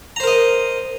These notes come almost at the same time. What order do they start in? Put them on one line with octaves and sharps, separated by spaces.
A#5 C5 A#4 D#5